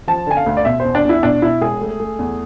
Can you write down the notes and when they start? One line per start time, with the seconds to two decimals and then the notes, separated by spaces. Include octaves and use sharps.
0.08 F3 A5
0.27 D3 G#5
0.37 F5
0.46 D2
0.57 D5
0.65 B2 E5
0.80 E2 C5
0.95 D4
1.04 E2
1.09 E4
1.23 B2 D4
1.42 B2 E4
1.61 E1 G#4
1.81 A3
2.00 A3
2.19 E2